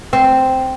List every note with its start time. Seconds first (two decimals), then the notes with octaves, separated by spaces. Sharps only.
0.13 C4